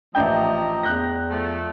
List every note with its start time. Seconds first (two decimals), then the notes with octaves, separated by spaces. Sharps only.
0.15 A1 F3 A3 D4 D#5 G5 A#5 G6
0.83 E2 F#6 G6 A#6
1.30 F3 A3